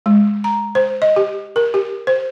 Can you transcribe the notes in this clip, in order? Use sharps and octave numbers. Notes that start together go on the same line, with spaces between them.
G#3
A#5
C5
D#5
G4
A#4
G4
C5